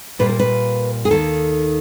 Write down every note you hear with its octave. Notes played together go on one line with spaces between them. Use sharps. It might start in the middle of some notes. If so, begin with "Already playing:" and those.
A#2 G3 A#3 B4
A#4
B4
G#4
D#2 D#3 G3 A#3 A4